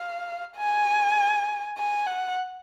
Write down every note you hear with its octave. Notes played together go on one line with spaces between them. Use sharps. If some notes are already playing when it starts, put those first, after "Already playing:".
Already playing: F5
G#5
G#5
F#5